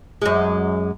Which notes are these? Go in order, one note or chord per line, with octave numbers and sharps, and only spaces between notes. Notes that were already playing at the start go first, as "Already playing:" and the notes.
F#2 G#3